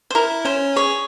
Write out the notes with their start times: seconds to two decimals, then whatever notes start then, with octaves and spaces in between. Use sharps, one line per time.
0.10 C5
0.15 E4 A#4
0.45 C#4 C5
0.76 G#4 C#5